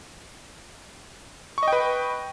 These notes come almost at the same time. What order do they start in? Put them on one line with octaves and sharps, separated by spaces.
C#6 D#5 G5 B4